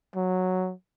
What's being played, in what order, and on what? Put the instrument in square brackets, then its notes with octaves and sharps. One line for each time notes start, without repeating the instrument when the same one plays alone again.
[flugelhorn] F#3